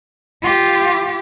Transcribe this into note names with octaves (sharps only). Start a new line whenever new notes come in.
F4 G4